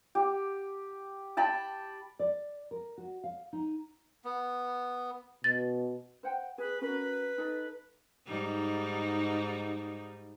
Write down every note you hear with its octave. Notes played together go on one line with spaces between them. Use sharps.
G4
G5 A5 B5
D5
A#4
F#4
F5
D#4
B3
B2 A6
C5 F#5 G5
G#4 B4
C#4 F#4 A#4 B4
D#4 A4
G#2 G3 D#4